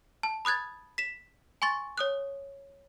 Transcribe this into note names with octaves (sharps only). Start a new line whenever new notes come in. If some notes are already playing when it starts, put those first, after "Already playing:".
A5
B5 D#6 F#6 G#6 A6
B6 E7
G#5 C6 C#6 A6
C#5 D#6 F#6